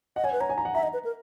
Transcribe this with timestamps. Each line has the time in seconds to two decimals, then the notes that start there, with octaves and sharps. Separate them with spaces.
0.16 D#5 F#5
0.24 C#5 G#5
0.32 B4
0.40 C#5 A#5
0.50 G#5
0.58 A#5
0.65 F#5
0.75 E5 A#5
0.83 D#5
0.93 B4
1.05 A#4